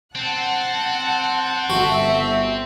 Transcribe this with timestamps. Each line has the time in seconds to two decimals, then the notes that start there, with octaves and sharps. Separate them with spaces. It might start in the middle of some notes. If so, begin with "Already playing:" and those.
0.15 C4 F#5 A5 F#6
1.70 G1 F#4 A4 E5